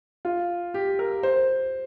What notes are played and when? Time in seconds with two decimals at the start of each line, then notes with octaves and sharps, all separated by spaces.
0.25 F4
0.74 G4
0.99 A#4
1.23 C5